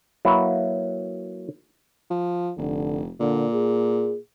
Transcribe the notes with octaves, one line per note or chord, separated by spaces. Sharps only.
F#3 A#3 E4 B4
F3
F1 D3
A#2 D3
G#4